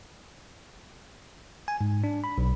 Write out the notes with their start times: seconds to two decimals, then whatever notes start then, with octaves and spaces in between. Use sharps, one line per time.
1.68 G#5
1.81 G#2
2.04 D4
2.24 B5
2.38 B1